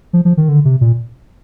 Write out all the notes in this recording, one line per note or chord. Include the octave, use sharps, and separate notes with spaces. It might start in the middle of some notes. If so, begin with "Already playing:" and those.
F3
F3
D#3
D3
C3
A#2